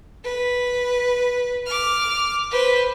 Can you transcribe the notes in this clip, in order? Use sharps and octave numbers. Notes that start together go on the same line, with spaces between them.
B4
D6 F6
B4 C5